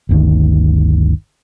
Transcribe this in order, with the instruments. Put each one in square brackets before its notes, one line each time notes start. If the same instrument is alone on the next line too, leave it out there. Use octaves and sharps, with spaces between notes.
[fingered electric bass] G1 D2 D#3